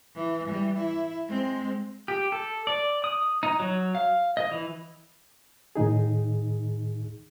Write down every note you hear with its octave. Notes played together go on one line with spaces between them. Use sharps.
E3
E3 G3
E4
G#3 C4
G4
A4
D5
D#6
D#4
F#3
F5
D#5
E3
A2 D#3 D#4 G#4